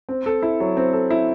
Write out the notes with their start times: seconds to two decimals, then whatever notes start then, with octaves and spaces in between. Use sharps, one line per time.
0.09 C4
0.26 A4
0.42 E4
0.60 F#3
0.77 C4
0.93 A4
1.10 E4